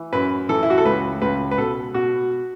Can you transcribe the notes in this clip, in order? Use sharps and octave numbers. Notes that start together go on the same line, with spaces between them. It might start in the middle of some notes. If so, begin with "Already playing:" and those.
Already playing: E3
F#2 B4
E3 A4
E4
F#4
A4
C#2 B4
C#2 B4
B4
B2 A4
B2 F#4